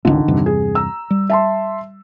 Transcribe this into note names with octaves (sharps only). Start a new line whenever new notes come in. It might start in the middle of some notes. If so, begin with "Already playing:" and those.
G#1 C#2 D3 D#3
E2 G2 C3
G#4
A#5 E6
G3
E5 A5 C6